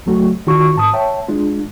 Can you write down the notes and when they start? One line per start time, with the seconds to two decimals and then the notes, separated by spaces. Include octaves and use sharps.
0.06 C#2 F#3 A3 F#4
0.47 D#3 F4 F#4 C#6
0.76 G#2 A5 D#6
0.94 C#5 E5 G5 A5
1.28 G#3 D4 F4